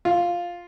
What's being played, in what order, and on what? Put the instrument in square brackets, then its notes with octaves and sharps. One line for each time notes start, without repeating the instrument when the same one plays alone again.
[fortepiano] F4